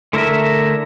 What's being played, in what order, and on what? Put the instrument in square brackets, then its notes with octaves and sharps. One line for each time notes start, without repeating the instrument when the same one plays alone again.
[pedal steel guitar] D3 A3 E4 A#4 E5